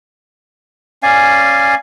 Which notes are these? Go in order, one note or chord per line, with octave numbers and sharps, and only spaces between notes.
C#4 D5 F5 G#5